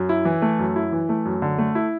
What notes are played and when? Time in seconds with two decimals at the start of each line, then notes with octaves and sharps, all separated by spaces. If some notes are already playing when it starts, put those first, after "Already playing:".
Already playing: F#2
0.09 E4
0.25 E3
0.42 A3
0.59 F#2
0.76 E4
0.92 E3
1.09 A3
1.25 F#2
1.42 D3
1.58 A3
1.75 E4